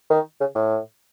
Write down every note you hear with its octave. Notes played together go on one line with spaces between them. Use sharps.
D#3
C#3
A2